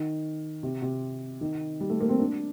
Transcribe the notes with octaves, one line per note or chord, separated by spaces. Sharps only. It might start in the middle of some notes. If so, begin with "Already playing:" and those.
Already playing: D#3
C3
C3
D#3
G3
A3
A#3
C4
D4